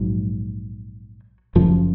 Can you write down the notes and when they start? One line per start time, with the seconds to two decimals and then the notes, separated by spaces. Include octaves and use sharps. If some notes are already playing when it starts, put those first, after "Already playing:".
Already playing: A#1 G#2 F#3
1.55 F#1 F#2 C#3 F3